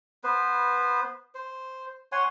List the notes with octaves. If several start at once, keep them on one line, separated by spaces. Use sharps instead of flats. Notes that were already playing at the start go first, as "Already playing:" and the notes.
B3 B4 C5
C5
C#5 F#5 G#5 C6